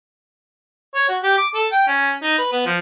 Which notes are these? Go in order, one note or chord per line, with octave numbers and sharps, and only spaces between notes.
C#5
F#4
G4
D6
A4
G5
C#4
D#4
B4
B3
F3